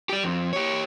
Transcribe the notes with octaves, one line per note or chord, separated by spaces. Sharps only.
G4 D5
F2
G4 C#5